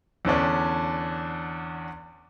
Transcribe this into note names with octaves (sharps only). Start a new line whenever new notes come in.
E2 D3 C#4 D4